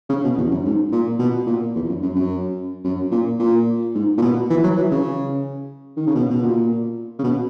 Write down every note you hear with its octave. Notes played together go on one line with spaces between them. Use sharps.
C#3
B2
E2
F#2
G#2
A#2
B2
A#2
E2
F#2
F#2
F#2
F#2
A#2
A#2
G#2
A#2
B2
E3
F#3
E3
C#3
D#3
C#3
B2
B2
A#2
C#3
B2